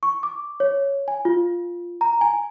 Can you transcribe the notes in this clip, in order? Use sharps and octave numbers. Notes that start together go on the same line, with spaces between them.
C#6
D6
C#5
G#5
F4
A#5
G#5